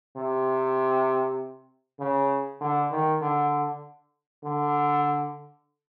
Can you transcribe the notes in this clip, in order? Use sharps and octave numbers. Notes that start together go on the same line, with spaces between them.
C3
C#3
D3
D#3
D3
D3